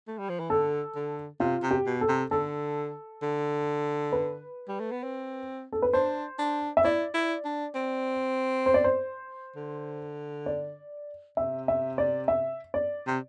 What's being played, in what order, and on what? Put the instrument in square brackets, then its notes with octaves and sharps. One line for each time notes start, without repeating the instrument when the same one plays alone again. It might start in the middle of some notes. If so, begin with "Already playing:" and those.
[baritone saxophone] A3
G3
F3
E3
[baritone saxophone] D3 [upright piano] A4
[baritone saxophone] D3
[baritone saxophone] C3 [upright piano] F4
[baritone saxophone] C3
[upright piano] G4
[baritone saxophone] B2
[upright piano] A4
[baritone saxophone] C3
[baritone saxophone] D3 [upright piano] A4
[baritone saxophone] D3
[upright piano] B4
[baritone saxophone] G3
A3
B3
C4
[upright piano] A4
B4
[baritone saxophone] D4 [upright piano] C5
[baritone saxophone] D4
[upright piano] E5
[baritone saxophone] E4 [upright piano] D5
[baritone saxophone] E4
D4
C4
[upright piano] C5
D5
C5
[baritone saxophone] D3
[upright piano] D5
[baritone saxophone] C3 [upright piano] E5
[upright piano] E5
D5
E5
D5
[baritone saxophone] C3